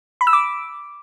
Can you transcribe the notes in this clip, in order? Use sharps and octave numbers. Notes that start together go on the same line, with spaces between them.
B5
E6
D6